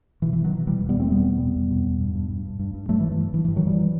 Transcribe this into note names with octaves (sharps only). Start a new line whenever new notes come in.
B2 E3
E3
B2
D#3 F#3
B2
B2 E3 G3
E2
G3 B3
E2 A3 C4
B2 G3 B3
E2
E2
E2
B2
E2
G2
G2
G2
G2
G2
G2
G2 F#3 A3
E3
G2
E3
G2
G2 E3
E3
G2
D#3 F#3
G2 E3 G3